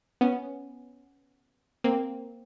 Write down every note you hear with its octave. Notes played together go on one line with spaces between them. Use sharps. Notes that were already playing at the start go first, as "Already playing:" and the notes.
B3 C#4
A#3 C4